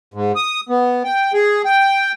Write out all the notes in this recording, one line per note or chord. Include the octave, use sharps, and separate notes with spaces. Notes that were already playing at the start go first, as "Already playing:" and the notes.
G#2
D#6
B3
G5
G#4
G5